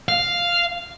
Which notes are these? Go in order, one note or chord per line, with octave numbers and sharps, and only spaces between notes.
F5